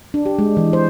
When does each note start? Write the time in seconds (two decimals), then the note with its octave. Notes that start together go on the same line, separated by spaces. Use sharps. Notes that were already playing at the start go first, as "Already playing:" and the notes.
0.14 D4
0.26 G4
0.39 G#3
0.57 E3
0.73 C5